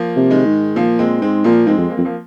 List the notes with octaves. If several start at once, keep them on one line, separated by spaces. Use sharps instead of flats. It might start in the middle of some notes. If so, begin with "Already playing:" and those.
Already playing: F3 A#3
C3
D#3 G#3
G#2
A#2 F3 A#3
A#2 G#3 C4
G#2 G#3 C4
A#2 F3 A#3
G#2 G#3 C4
F2
A#3
F2 C4
F3 A#3